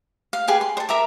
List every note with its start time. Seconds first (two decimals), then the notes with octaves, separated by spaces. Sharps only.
0.33 F5
0.48 G4 G#4 B4 F5
0.61 C6
0.77 A4 C5
0.89 A#4 E5 A#5 D6